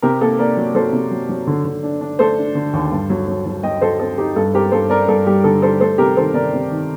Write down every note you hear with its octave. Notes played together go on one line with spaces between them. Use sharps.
C3 G4 A#4
A#3 A4
A#3 A#4 D5
F#3
F#3 A4 C5
C3
F#3
F#3
D3
D3
D4
D4
A3 A4 C5
D4
D3
D#2
G2
F#3
F#3
F#3
F#3 D#5 G5
F#3 A4 C5
C4 A4
D#4 G4
G2 A4
C4 G4 A#4
G2 A4 C5
C4 A#4 D5
G2 A4
G3 G4
D3 A4
G3 A4 C5
A3 A4 C5
C3 G4 A#4
D#3 A4 C5
C3 A#4 D5
C3
D#3